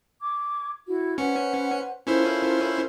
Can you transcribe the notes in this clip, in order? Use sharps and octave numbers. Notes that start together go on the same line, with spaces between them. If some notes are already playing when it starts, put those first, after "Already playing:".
C#6 D6 G#6
E4 F#4
C#4 B4 C5 F#5 C#7
C#4 E4 F4 A4 A#4 C5